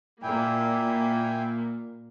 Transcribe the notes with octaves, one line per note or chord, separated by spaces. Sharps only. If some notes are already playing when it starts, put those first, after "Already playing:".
A#2 A#3 E4 G5 G#5